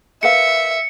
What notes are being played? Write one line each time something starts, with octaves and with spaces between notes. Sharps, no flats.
A#4 B4 E5 F5 C#7